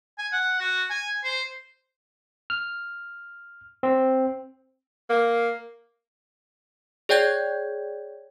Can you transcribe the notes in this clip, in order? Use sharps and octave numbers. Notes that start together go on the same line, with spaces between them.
G#5
F#5
F#4
G#5
C5
F6
C4
A#3
G#4 C#5 D5 G5 G6 G#6